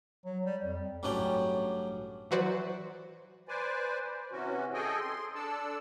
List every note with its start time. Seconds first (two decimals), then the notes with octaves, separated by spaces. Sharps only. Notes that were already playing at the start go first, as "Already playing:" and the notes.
0.25 F#3
0.45 G3
0.64 F2
1.03 A1 G2 F#3 C#4 D5 G5
2.31 E3 F#3 F#4 B4 C5 D5
3.48 B4 C5 D5 G#5
4.32 C3 E3 C#4 F#4
4.74 G#4 A4 D#5 G5 G#5
5.00 C6
5.35 D4 A4 D5 A5 E6